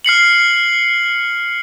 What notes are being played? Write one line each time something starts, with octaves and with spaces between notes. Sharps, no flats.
F6 C7 C#7 F#7